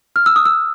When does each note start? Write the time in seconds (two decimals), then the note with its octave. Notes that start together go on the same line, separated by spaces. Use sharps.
0.16 F6
0.26 E6
0.36 D#6
0.45 E6